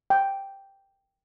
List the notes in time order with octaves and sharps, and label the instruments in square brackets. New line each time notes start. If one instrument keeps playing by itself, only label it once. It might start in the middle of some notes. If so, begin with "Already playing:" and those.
[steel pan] G5